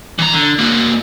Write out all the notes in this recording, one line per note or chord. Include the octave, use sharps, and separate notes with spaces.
E3 A#5
D3
A#3 F#4